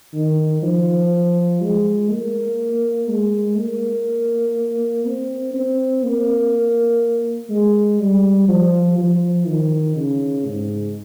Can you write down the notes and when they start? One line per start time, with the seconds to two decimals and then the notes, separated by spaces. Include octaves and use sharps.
0.13 D#3
0.62 F3
1.61 G#3
2.09 A#3
3.08 G#3
3.57 A#3
5.05 C4
5.54 C4
6.03 A#3
7.50 G#3
8.00 G3
8.48 F3
8.98 F3
9.47 D#3
9.96 C#3
10.45 G#2